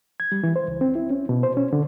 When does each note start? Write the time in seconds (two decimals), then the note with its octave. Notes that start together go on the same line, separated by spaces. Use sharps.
0.20 G#6
0.32 G3
0.43 E3
0.56 C5
0.68 C#2
0.81 C4
0.95 E4
1.10 C#4
1.29 B2
1.43 C5
1.57 C#4
1.73 D3